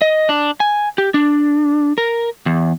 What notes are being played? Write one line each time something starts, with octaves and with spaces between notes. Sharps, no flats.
D#5
D4
G#5
G4
D4
A#4
E2